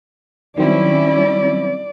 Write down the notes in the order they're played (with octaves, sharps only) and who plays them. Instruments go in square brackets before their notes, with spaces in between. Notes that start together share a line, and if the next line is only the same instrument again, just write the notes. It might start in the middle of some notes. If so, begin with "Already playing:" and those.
[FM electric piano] D#3 F#3 C4 [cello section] G3 C#4 E4 [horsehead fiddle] D5